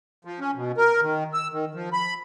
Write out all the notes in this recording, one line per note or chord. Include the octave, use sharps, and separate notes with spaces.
F3
C#4
B2
A#4
D#3
E6
D#3
F3
B5